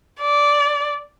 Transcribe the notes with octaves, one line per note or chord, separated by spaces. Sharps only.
D5